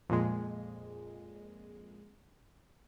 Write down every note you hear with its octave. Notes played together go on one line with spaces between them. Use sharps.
F2 A#2 G#3